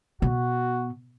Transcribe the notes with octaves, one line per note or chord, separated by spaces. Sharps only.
B2 F#4